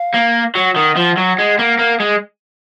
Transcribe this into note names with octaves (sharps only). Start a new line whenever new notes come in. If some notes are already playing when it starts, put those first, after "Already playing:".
Already playing: F5
A#3
F#3 F#5
D#3
F3
F#3
G#3
A#3
A#3
G#3